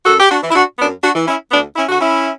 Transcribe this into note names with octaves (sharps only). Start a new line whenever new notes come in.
F#2 F#4 A4
G4
D4 F#4
E3
E4
D4 F#4
F#2 B3 D4
D4 F#4
E3
C#4 E4
D2 B3 D4
C#4 E4
D3 F#4
C#4 E4